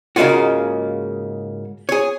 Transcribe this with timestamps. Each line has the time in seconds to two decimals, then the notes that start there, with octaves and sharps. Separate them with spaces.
0.16 G#2 C#3 G#3 A#3 F4 F#4
1.89 G#4 C#5